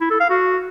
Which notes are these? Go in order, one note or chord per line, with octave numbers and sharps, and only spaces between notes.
E4
A4
F5
F#4